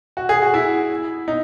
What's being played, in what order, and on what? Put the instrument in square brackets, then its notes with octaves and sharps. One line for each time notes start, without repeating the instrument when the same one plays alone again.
[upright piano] F#4
G#4
F#4
E4
D#4